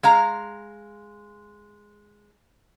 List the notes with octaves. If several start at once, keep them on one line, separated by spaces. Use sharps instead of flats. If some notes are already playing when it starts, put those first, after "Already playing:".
G#3 F5 A#5